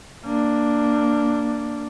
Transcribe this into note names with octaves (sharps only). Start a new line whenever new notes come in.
A#3 D4